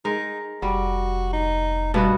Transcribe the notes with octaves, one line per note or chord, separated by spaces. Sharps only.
G#3 D#4 A#4
F1 G3 F#4
D#4
G2 B2 B3 F#4 A5